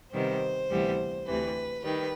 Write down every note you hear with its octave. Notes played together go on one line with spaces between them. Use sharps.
C3 D#3 G3 B3 C5
D2 C3 E3 G3 B3
D2 C3 E3 B4
D#3 G3 B4